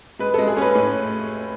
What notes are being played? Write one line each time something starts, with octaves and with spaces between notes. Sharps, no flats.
G#3 B4
G#3 A4
G#4
C#4 B4
A2